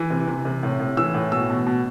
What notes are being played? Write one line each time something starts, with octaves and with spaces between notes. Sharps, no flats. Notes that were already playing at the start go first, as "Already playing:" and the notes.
Already playing: E3
C3
C3
C3
A2
A2
E3 E6
A2
B2 E6
B2
B2